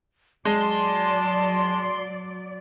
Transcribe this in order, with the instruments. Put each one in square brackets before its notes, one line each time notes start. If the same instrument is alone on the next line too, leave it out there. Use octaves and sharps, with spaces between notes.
[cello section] F#3 D5 [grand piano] G#3 [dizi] A5 [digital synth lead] C6